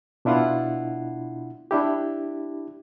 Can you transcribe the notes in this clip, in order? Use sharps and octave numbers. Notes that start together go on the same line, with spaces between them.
B2 D4 E4 F4 F#5
D4 E4 G4